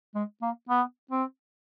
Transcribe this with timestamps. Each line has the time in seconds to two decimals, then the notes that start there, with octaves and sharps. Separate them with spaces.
0.15 G#3
0.42 A#3
0.69 B3
1.11 C4